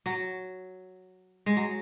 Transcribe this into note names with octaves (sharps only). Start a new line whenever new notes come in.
F#3
G#3
F#3